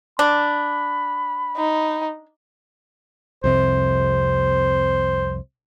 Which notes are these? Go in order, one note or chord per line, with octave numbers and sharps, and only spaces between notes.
D4 B5
D#4
C2 F2 C3 C5